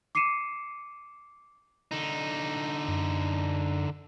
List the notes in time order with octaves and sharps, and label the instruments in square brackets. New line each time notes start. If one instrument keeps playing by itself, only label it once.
[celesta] D6 C7 C#7 D#7 E7
[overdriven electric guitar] D3 D#4
[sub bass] F#2